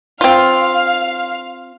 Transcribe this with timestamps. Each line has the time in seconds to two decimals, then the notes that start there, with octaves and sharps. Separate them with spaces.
0.21 C4 F4 F5